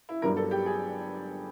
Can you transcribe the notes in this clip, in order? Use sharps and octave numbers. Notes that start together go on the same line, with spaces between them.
E4
G1 G2 D3 F#3 A#4
A4
G4
G#4